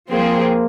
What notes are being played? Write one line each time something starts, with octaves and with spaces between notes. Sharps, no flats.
F3 A#3 C4 G#4